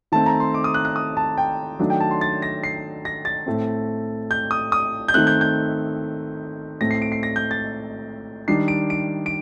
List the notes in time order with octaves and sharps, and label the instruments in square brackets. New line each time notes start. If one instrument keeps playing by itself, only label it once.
[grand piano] D#3 A3 C4 A5
A#5
C6
D6
D#6
F#6
F#6
D#6
A5
G5
D#3 F#3 A3 D4
G5
A5
C6
A6
A#6
C7
A#6
A6
A2 A3 C4
G6
D#6
D#6
G6
D#3 A3 C4 F#6
G6
G6
A2 A3 C4 A#6
C7
D7
C7
A#6
G6
A6
D#3 G3 D4 C7
D7
D7
D7